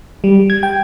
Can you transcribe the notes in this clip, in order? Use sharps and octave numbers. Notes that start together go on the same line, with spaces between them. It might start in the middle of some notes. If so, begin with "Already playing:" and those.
G3
G#6
G5